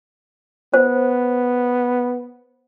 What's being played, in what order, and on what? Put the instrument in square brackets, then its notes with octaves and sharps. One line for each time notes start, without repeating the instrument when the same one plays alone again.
[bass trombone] B3 [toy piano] C5